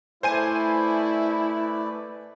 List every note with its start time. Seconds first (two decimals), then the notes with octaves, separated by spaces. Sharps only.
0.23 A3 E4 B4 C5 D5 G#5 D#7